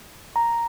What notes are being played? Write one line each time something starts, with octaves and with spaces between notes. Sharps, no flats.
A#5